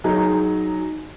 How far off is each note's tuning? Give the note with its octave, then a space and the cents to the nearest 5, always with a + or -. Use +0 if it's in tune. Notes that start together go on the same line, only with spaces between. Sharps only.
F#3 +0 D#4 +0 G#4 +15